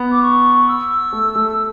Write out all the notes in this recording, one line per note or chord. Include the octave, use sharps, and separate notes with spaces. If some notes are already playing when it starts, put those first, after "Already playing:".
Already playing: B3
D6
C#6
E6
A3
A3